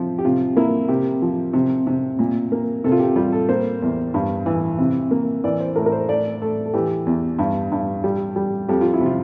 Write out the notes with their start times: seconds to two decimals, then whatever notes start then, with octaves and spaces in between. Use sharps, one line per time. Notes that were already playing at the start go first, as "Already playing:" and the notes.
Already playing: C3 F3
0.19 G4
0.25 C3 F4
0.56 A#3 E4
0.88 C3 G4
1.22 F3
1.53 C3
1.87 C3
2.19 A#2
2.52 A#3
2.84 C3 A4
2.92 F4
3.00 G4
3.16 G3 F4
3.32 A4
3.49 A#3 C5
3.82 E2
4.14 G2
4.46 E3
4.78 C3
5.11 A#3
5.44 E3 D5
5.60 C5
5.76 A2 A#4
5.86 A#4
5.92 C5
6.09 A3 D5
6.42 A3 A4
6.66 A4
6.74 E3 G4
7.06 E2
7.38 G2
7.72 G2
8.04 G3
8.36 G3
8.69 F2 G4
8.81 F4
8.94 E4
9.01 C3 F4